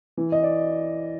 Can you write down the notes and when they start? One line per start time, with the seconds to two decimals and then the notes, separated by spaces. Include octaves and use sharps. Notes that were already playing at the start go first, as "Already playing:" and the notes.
0.17 E3
0.32 D#5
0.43 D5